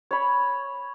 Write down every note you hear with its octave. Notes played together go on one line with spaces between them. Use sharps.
C#5 B5